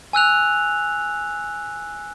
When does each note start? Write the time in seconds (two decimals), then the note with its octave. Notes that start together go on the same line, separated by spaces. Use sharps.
0.13 G#5 E6 F#6 F7